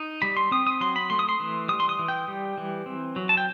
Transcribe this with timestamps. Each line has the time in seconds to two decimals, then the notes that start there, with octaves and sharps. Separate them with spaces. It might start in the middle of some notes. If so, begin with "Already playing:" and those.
Already playing: D#4
0.22 G3 B5
0.37 C6
0.51 C4 D#6
0.67 D#6
0.81 F#3 C6
0.96 B5
1.10 A3 C6
1.19 D#6
1.29 C6
1.40 E3
1.68 G3 D#6
1.80 C6
1.89 D#6
1.99 E3
2.08 G5
2.28 G3
2.58 E3
2.86 C4
3.16 F#3
3.29 A5
3.37 G5